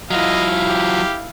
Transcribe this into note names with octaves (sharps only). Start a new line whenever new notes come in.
F#3 E4 F4 D#5 F5
G4